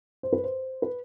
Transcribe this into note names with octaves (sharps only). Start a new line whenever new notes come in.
C5
B4
C5
B4